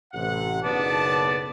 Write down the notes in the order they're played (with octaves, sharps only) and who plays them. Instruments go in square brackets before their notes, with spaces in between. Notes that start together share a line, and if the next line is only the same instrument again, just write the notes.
[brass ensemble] A1 C3 F#5
[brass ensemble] F#1 B1 A5 [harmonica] B3 D5 D6